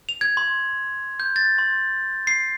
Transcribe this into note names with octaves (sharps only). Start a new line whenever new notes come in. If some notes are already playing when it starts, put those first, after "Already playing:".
F7
G#6
C6
G6
A6
C6
C7